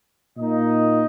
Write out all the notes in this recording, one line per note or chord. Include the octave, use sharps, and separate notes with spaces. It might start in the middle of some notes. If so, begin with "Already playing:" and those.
A#2 A#3 D#4 D#5